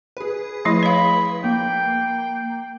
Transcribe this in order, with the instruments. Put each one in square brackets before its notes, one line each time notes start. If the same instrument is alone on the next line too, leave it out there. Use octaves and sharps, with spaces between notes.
[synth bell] G#4 B4
[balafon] F3 A3 E4 [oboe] D#5
[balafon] C#5 F5 [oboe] B5
[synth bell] A#3 [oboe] G5